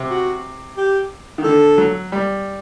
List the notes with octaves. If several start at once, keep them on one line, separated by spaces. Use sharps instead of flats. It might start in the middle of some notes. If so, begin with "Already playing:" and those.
Already playing: C3
F#4
G4
D#3
D3 A4
F#3
G3